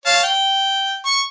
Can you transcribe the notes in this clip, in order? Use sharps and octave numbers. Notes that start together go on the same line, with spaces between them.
C#5 F5 A5
G5
C#6